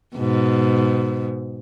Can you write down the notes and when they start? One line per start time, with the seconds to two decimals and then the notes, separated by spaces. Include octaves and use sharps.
0.17 G#2 B2